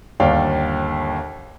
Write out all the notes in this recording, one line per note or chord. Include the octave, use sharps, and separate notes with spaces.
G1 D#2 D5 F5 G5